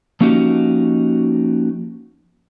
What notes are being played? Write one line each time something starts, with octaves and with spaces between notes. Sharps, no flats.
F3 A#3 C#4 D#4 F#4 G4